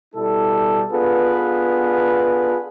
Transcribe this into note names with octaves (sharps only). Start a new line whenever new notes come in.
B2 G3 E4 A4
B3 D4 F4 G#4 A4 B4